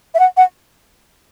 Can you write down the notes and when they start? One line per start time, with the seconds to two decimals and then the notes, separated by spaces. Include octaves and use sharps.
0.14 E5
0.19 F#5
0.37 F#5